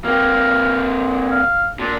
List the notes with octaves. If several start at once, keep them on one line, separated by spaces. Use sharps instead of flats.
A#3 C4 F5
F5
A#2 D4